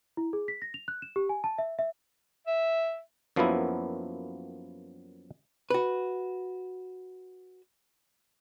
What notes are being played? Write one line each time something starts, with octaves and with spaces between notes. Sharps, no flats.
E4
G#4
B6
A#6
F7
F#6
E7
G4
G#5
A5
E5
E5
E5
F#2 F3 F#3 A#3 B3 E4
F#4 B4